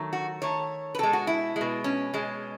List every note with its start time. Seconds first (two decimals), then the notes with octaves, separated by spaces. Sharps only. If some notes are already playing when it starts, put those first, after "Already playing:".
Already playing: D#3 F#3 A3
0.13 F#4
0.42 D#3 A3 C#5
0.95 B4
0.98 B2 G#3 A4
1.13 F#4
1.27 E4
1.56 G#3
1.61 B2
1.84 C#4
2.14 B2 G#3